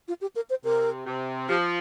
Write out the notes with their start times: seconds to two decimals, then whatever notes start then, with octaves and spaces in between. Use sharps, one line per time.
0.08 F4
0.21 G4
0.36 A#4
0.50 C5
0.64 C3 A#4
1.06 C3
1.48 F3 G4